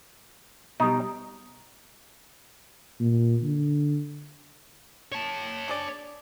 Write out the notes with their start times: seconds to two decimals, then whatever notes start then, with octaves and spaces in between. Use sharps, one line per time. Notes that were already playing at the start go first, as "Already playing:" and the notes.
0.80 B2 G3 D#4
3.00 A#2
3.43 D3
5.12 C#5 A5
5.68 D4 G#4 D5